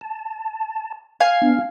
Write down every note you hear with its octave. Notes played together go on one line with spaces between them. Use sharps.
A5
F5 G#5
B3 D4